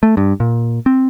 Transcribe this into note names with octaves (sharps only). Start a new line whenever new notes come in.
A3
G2
A#2
C4